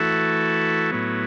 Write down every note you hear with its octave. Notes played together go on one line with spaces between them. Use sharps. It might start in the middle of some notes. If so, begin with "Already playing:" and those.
Already playing: E3 A3 F#4 A4
A2 F#3 B3